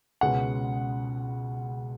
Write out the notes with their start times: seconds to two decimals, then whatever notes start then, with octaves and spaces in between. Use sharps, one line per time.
0.21 C#2 B2 G#3 C#4 F#5